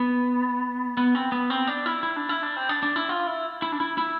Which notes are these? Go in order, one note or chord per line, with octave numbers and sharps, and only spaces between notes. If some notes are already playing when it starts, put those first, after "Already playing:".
Already playing: B3
B3
C4
B3
C4
D4
E4
E4
D4
E4
D4
C4
D4
D4
E4
F4
E4
E4
D4
E4
E4